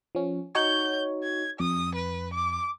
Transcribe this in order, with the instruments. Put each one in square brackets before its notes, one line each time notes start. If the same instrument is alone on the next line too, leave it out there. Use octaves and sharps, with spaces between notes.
[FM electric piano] F3 C#4
[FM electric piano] D#4 F#4 C#5 [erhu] G6
[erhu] G#6
[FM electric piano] F2 [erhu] D#6
[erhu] B4
D6